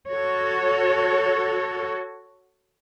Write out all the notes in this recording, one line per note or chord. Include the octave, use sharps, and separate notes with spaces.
F#4 A4 C#5